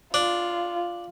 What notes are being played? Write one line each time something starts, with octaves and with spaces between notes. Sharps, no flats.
D4 F4